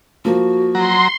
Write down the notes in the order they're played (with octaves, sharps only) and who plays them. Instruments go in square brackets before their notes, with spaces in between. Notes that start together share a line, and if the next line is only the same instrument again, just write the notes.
[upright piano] F3 A#3 [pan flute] F#4
[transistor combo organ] F#3 A#5 [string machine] C6